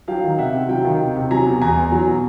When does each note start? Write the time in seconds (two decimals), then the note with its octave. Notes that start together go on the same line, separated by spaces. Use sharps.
0.08 F#3 F5 G5
0.24 D#3
0.38 C3 E5 F#5
0.54 C3
0.69 F#3 F5 G5
0.85 D#3
1.00 C3
1.16 C3
1.31 F#3 G#5 A#5
1.46 B2
1.61 E2 G#5 A#5
1.77 E2
1.92 F#3
2.07 B2